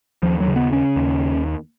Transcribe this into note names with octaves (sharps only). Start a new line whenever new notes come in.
D#2 F3
F#3
C#3
B3
C#3 C#4
D#2